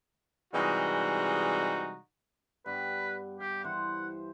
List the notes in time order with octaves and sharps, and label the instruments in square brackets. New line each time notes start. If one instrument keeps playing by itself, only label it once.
[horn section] C3 E3 G3 G#3 D#4 F#4
[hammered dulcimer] G2 B3 [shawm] B4
[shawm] G4 [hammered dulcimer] F5
[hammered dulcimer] E3 C5 [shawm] F#5